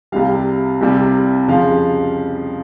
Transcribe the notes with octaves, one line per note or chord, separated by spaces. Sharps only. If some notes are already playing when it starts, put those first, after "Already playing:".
C2 C3 G3 F5
C2 C3 G3
F2 C#3 F3 F5